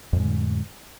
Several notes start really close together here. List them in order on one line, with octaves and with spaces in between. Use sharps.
F2 A2 G#3 D3